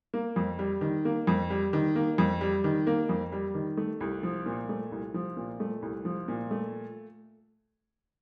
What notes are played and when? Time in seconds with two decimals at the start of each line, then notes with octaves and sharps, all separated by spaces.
0.14 A#3
0.36 F2
0.59 G3
0.81 D#3
1.05 A#3
1.27 F2
1.50 G3
1.73 D#3
1.96 A#3
2.18 F2
2.41 G3
2.64 D#3
2.87 A#3
3.09 F2
3.32 G3
3.54 D#3
3.77 A3
4.01 C2
4.23 F3
4.46 A#2
4.69 A3
4.92 C2
5.14 F3
5.37 A#2
5.60 A3
5.82 C2
6.05 F3
6.28 A#2
6.51 A3